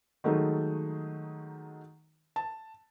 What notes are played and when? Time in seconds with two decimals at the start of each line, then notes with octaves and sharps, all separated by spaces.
0.24 D#3 F#3 G#3 A3 D#4
2.36 A5